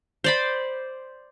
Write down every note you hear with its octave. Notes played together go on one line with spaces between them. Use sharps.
C5 D5 B5